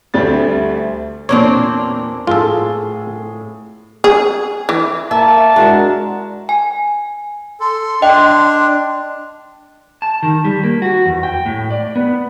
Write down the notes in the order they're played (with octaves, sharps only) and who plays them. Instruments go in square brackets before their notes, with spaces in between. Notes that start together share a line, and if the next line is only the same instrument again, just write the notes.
[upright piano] D2 G3 A3 A6
[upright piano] E2 A#2 [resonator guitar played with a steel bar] A#3 C4 D4 [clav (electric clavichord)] C#5
[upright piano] A2 G#4 G7 [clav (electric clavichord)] F4 A4
[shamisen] G#4
E3
[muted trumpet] A#3 [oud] E5 [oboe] A5
[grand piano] G#3 E4 F#4 [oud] D4 [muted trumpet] A#4
[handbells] G#5
[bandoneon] A4 [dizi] C6
[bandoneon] D4 [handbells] D#5 G5
[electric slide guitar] A5
D#3
G3
A#3
F#4
E2
G5
A2
D5
B3